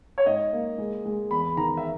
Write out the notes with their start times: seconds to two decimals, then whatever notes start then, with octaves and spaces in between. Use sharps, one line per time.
0.18 C#5
0.26 G#2 D#5
0.53 A#3
0.78 G#3
1.05 G#3
1.31 E2 B5
1.57 D#3 A#5
1.77 E5